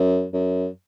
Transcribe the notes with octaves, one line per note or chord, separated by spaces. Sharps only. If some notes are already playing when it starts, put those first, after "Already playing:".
Already playing: F#2
F#2